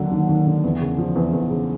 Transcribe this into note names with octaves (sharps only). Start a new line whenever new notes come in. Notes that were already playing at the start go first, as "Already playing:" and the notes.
Already playing: D#2 D3 F#3
D#2
D#2
D3
E2
C#3
F3
E2
E2
C#3